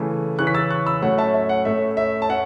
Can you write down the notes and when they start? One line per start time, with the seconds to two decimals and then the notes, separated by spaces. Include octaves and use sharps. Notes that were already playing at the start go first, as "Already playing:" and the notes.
Already playing: C#3 E3 A3
0.39 C#3 E3 C#4 C#6 F#6
0.47 B6
0.54 E6 A6
0.71 C#6 F#6
0.86 B5 E6
1.02 A2 F#3 A3 C#4 F#5
1.18 E5 A5
1.34 E5
1.49 F#5
1.65 A2 A3 C#4 E5
1.97 E5
2.22 A5
2.29 C#4 F#5